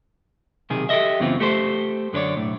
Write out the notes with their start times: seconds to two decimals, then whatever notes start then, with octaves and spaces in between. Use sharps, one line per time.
0.70 B1 C3 D#3 G#4
0.89 G4 A4 A#4 D#5 E5
1.20 F#2 C#3 E3 B3 C4 F4
1.40 A3 G4 A4 C5
2.13 F#2 D3 B4 C#5 D5
2.37 B1 A2